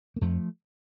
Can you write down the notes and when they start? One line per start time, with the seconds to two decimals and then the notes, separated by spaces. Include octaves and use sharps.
0.16 A#3
0.21 F2 F3 A3